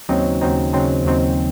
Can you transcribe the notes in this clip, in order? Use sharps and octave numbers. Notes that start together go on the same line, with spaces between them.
D#2 C#3 F#3 C4 D#4
D#2 C#3 F#3 C4 D#4
D#2 C#3 F#3 C4 D#4
D#2 C#3 F#3 C4 D#4